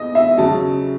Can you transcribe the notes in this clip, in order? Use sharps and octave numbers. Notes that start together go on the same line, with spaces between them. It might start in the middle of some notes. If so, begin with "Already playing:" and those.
Already playing: E2 D#5
E5
C#3 F#3 A5